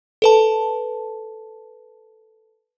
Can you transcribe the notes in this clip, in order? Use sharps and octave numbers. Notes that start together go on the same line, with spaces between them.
A4 B4 A5